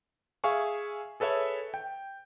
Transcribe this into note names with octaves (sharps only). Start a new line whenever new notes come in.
G#4 E5 F5 G#5 C#6
G#4 A4 B4 C#5 E5
G5